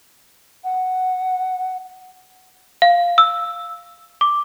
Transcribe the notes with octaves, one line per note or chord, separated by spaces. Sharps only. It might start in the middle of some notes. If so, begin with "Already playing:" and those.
F#5
F5
E6
D6